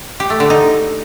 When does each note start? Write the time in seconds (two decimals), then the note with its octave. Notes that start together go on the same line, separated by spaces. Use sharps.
0.20 G4
0.30 A3
0.40 D3
0.50 D#4